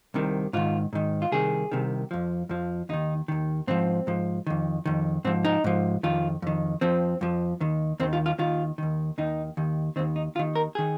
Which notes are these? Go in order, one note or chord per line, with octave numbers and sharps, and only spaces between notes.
C2 C3 D#3
G#2 D#3 F4
G#2 D#3
F4
C2 C3 D#3 G#4
C2 C3 D#3
F2 F3
F2 F3
D#2 D#3 D#4
D#2 D#3
G#2 F3 C4
G#2 F3
F2 D#3
F2 D#3
G#2 F3 C4
D#4
G#2 F3
F2 D#3 F4
F2 D#3
F2 F3 C4
F2 F3
D#2 D#3
D#2 D#3 C4
F4
F4
D#2 D#3 F4
D#2 D#3
D#2 D#3 D#4
D#2 D#3
D#2 D#3 C4
D#4
D#2 D#3 F4
A#4
D#3 G#4